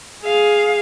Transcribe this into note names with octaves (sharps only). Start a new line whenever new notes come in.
G#4 F5